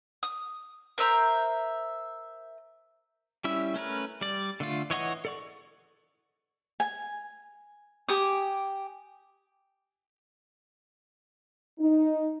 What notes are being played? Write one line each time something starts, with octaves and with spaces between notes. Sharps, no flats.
D#6
A#4 C5 E5 A#5
G3 C#4 E4 E5 E6
A3 C#4 A#4 B4
G3 D5
D3 A3 F4
E3 C#5 D#5 F#5 C#6
A4 D5 C#6
G#5
G4 G#5 D6 D#6
D#4